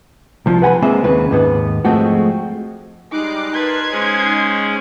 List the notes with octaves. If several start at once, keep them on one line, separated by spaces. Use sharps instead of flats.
C2 F3 F4
B4 F#5 G#5 A#5 B5
C#3 G#3 A#3 C4 E5 G#5
D#2 C#3 B4
D#2 G#2 B3
F3 G#3 A3 C4 F#4
G3 G#3 D#4 D6 F#6 C7
A#4 B4 A5 C6 G#6
G#3 C#4 G#4 C5